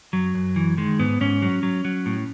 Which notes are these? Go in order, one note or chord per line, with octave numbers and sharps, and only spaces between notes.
F#2 F#3
F#2
E3
D#3 G#3
G#2 B3
G#2 C#4
F#3
F#3
F#3
A2